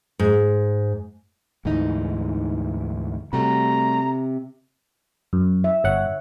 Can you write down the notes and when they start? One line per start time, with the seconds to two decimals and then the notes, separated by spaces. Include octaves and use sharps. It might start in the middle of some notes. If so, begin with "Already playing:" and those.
0.19 G#2
1.65 D2 G#2 E3 D#4
3.33 C3 G3 A3 F#4 A#5
5.33 F#2
5.64 E5
5.84 G1 C#5 F#5